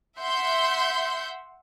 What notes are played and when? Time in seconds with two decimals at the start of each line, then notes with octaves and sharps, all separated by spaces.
0.19 E5 F#5 C6 G6